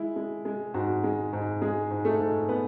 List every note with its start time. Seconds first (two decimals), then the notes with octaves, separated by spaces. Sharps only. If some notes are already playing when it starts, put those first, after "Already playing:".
Already playing: G#3 E4
0.16 G#3
0.45 G#3
0.74 G#2 F#4
1.04 G#3
1.33 G#2
1.62 G#3 G#4
1.91 G#2
2.05 A3 A4
2.20 G#2
2.49 B3 B4